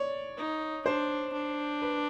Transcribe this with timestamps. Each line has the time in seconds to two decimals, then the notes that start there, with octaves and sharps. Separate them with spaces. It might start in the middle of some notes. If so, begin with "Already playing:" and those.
Already playing: C#5 D5
0.37 D#4
0.86 D4 C5
1.33 D4
1.82 B4